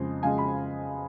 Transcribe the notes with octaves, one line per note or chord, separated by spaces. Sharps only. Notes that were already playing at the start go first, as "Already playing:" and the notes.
Already playing: F2 C#3 G#3
F2 C#3 G#3 F5 G#5
B5